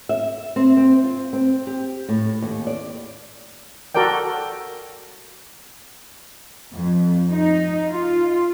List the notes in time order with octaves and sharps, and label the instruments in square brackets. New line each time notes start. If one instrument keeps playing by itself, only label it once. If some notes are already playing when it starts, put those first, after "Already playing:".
[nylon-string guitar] E5
C4
C4
F4
C4
G4
A2
D#2
D5
[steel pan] F#4 A4 A#4 D5 G5
[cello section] F2
D#4
F4